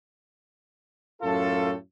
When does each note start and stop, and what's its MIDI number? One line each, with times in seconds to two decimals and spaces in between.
1.22 1.71 42
1.22 1.71 45
1.22 1.71 65
1.22 1.71 69